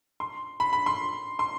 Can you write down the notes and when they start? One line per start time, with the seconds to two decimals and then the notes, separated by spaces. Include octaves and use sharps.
0.20 C6
0.60 B5
0.73 B5
0.86 C6
1.39 C6